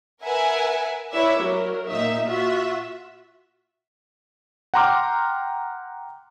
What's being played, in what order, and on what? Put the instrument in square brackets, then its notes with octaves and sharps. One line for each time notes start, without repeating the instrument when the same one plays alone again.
[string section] A#4 B4 E5 F#5 G#5
E4 B4 C#5 D5 E5
F#3 A#4
A#2 A#3 D#4 E5
F4 F#4 E5
[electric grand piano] F#5 G5 A#5 C6 D6 F6